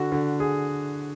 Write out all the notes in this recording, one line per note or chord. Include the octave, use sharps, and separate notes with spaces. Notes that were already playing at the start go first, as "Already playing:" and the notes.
Already playing: D3 F#4
D3
G#4